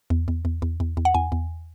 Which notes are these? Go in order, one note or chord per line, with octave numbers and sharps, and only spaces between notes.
E2
E2
E2
E2
E2
E2
F#5
E2 G#5
E2